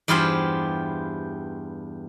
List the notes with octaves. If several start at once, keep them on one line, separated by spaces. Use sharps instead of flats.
E2 G2 E4 F4 G4 C5